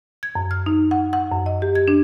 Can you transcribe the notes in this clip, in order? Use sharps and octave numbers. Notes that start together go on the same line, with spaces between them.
G#6
F#2
F6
D#4
F#5
F#5
F#2
D#5
G4
G#6
D4